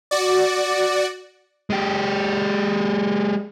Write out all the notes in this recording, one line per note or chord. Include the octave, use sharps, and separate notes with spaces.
F#4 D5
G#3 G4